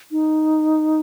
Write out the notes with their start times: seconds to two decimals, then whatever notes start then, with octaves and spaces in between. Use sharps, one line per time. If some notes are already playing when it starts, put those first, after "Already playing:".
0.11 D#4